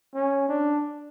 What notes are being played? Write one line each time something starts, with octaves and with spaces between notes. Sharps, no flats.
C#4
D4